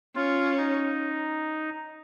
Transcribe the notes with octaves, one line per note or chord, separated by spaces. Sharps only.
C#4 F4
D#4